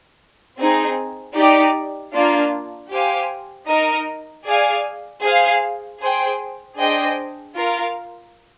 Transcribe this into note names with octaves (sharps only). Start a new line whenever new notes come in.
C4 D#4 G#4
D#4 G4 D5
A#3 D4 F4
G4 C5 F5 G#5
D#4 A#4 D#5
G#4 D5 F5 G#5
G#4 C5 F5
G#4 C5 G5
D4 G#4 C5 D#5 G5
F4 A#4 F5